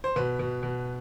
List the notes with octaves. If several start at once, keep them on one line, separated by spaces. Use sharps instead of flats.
C5
B2 B4
B2
B2